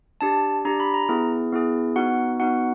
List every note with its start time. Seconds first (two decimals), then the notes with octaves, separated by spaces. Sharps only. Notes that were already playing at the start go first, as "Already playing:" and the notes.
0.21 D4 G4 A5
0.65 D4 G4 A#5
0.80 B5
0.94 A#5
1.09 B3 E4 G#4
1.52 B3 E4 G#4
1.96 B3 D#4 F#4 F#5
2.40 B3 D#4 F#4 F#5